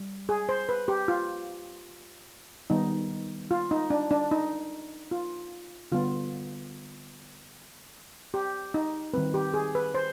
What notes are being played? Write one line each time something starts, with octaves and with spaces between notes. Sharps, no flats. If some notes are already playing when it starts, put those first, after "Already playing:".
Already playing: G3
G#4
C5
B4
G4
F4
D#3 G3 B3 D#4
F4
D#4
D4
D4
D#4
F4
D3 G3 B3 F4
G4
D#4
D#3 G3 C4 B4
G4
G#4
B4
C5